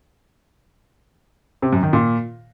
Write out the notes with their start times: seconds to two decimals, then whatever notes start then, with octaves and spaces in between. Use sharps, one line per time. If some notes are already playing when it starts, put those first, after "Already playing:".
1.62 C3
1.73 F#2
1.83 D#3
1.93 A#2